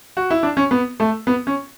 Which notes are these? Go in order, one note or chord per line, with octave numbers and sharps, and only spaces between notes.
F#4
E4
D4
C#4
B3
A3
B3
C#4